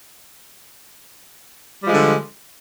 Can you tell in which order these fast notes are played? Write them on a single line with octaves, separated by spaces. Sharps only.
G3 F3 G#3 D3